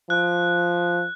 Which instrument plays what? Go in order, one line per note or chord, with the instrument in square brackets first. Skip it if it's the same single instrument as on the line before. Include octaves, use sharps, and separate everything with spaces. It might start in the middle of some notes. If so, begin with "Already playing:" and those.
[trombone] F3 [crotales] F#6